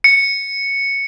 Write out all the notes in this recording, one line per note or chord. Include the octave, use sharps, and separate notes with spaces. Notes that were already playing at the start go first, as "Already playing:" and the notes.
C#7